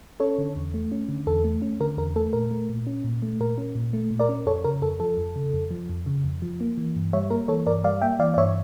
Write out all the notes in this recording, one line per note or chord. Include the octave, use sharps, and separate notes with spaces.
C#4 A4 C#5
D3
E2
A3
C#4
D3
E2 A4
A3
C#4
D3 A#4
E2 A#4
A3 A4
A#2 A#4
A3
A#2
C#4
A#2
A3
A#2 A#4
C#4
A#2
A3
A#2
A#4 D5
C#4
F2 A4 C#5
C#3 A#4
F2 A4
F3 A4
F2
C#3
F2
F3
F2
C#3
F2
F3
A#3
E3
G2
G3 C#5 E5
A#3 A#4
E3 A4 C#5
G2 A#4 D5
G3 D5 F5
A#3 E5 G5
E3 D5 F5
D5
G2 C#5 E5